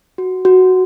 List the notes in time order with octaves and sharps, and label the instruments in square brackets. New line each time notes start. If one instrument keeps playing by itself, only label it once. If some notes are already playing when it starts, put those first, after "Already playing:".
[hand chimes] F#4
F#4